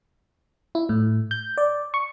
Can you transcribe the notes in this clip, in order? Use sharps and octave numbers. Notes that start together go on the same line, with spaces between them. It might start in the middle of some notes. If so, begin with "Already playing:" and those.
E4
A2
G6
D5
C#6